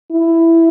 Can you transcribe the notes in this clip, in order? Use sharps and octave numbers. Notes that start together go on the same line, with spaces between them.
E4